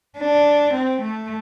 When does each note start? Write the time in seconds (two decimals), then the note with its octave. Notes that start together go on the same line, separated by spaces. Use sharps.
0.17 D4
0.74 C4
1.02 A3